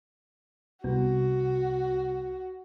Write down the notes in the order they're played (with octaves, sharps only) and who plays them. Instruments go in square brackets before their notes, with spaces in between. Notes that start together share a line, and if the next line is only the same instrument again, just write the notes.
[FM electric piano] C2 [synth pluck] B3 [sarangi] F#4